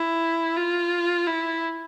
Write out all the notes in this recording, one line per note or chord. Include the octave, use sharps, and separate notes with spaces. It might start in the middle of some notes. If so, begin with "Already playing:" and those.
Already playing: E4
F4
E4